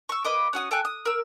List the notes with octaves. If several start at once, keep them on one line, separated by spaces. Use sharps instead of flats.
C#6 E6
A#3 B4 D#5 D6
C#4 F#4 D#6
A4 G5 G#5 F#6
D#6
A#4 E6